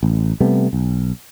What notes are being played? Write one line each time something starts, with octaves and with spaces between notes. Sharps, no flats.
A1
C3 G3 A3 B3
B1